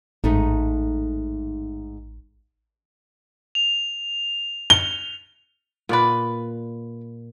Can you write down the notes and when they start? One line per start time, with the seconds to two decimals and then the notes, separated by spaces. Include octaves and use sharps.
0.24 A1 G#2 A3 D#4
3.55 F7
4.70 G7
5.89 A#2 B3 B4 D5